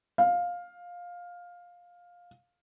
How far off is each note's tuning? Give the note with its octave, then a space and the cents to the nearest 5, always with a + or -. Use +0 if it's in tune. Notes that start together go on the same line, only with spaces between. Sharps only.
F5 +15